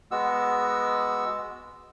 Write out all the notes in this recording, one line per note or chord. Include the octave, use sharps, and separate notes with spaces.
G#3 B3 F#4 E6